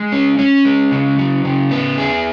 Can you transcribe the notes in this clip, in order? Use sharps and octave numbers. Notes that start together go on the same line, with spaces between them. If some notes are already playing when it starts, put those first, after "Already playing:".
Already playing: G#3
C#4
C#4
G#3
C#3
F#3
C#3
B3
G#4